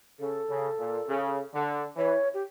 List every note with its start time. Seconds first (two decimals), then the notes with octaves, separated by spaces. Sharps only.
0.20 C#3 A4
0.49 C#3
0.79 A#2
1.08 C#3
1.53 D3
1.96 E3 C#5
2.34 G4